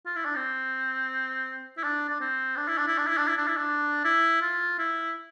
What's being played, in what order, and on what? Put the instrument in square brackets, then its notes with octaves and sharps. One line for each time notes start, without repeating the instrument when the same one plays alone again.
[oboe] F4
E4
D4
C4
E4
D4
D4
C4
D4
E4
D4
E4
D4
E4
D4
E4
D4
E4
D4
E4
F4
E4